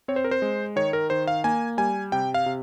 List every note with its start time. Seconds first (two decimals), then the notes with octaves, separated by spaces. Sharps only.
0.08 C4 C#5
0.16 C5
0.24 A#4
0.31 C5
0.42 G#3
0.76 D#3 C#5
0.93 A#4
1.10 D#3 C5
1.28 F5
1.44 A#3 G#5
1.78 G3 G#5
2.12 C3 G5
2.34 F5
2.46 C3